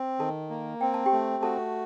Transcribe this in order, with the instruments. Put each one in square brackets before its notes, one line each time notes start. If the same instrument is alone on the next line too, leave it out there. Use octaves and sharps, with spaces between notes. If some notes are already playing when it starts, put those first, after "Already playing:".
Already playing: [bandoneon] C4
[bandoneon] D#3 [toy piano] A4 A5
[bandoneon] A#3
[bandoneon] C4 [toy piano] G5
[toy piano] A5
G4 G5
[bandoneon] A3
[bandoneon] F#4 [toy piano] A4 A5